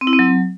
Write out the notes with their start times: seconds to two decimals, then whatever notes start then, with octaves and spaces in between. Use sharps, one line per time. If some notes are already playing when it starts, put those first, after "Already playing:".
0.01 C4
0.07 E4
0.13 C4
0.19 F#3